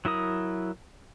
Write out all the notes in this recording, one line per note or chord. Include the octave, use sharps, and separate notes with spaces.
F#3 E4 A#4 D#6